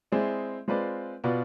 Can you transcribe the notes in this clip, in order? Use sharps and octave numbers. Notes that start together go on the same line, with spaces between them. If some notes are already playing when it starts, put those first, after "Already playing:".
G#3 C4 E4 G#4 D5
G#3 C4 F4 B4 D5
B2 B3 F4 B4 D5